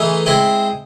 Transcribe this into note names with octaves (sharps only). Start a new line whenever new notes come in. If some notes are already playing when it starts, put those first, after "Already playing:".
Already playing: E3 A3 D#4 G#4
G#3 C4 E4